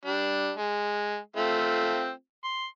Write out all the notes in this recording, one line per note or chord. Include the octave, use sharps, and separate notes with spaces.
G3 D4
G#3
A3 C4 F4
C6